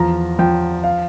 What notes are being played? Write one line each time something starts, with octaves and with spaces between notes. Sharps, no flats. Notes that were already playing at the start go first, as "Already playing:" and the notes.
Already playing: E2 F3 A#5
F3 G5
F5